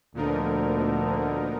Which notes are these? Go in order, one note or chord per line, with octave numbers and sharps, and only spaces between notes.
D2 A#2 D3 F3 B3 D#4 A#4